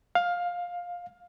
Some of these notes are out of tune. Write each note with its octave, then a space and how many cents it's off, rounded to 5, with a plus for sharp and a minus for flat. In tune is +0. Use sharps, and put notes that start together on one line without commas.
F5 +15